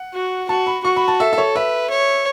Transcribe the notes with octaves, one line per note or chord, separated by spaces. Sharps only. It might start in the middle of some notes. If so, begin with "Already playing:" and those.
Already playing: F#5
F#4
F#4 A5
B5
F#4 C#6
B5
A5
A4 E5
E5
C#5
B4 E5
C#5